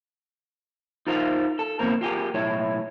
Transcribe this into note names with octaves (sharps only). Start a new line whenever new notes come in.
D#4 F4 A#4 C5 D5 F5
A4
C#2 B2 D#3 A#3 C4 A#4
F4 G4 G#4 A#4
B1 A2 E4 C#5